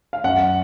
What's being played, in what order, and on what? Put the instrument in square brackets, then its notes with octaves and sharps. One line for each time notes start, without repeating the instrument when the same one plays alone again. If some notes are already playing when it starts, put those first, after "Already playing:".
[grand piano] F5
F#2 F#5